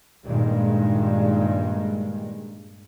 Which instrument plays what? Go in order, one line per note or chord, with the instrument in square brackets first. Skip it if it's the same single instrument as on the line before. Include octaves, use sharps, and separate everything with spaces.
[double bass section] G2 A#2 D#3 G3 G#3